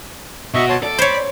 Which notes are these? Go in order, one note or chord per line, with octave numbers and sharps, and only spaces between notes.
B2 F#4 D#5 E5 C#6
C#5 A5 C6
A4 D5
C5 C#5 B5